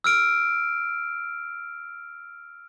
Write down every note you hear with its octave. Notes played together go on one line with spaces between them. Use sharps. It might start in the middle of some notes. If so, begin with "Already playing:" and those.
E6 F6 D7